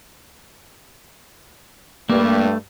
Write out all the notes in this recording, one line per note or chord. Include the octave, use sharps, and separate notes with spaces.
G2 A3 A#3